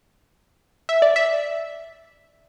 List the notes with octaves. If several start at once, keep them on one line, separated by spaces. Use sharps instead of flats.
E5
D5
E5